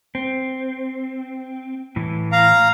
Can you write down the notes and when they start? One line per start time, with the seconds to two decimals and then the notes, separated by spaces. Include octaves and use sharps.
0.15 C4
1.96 A2 E3
2.32 F5 A#5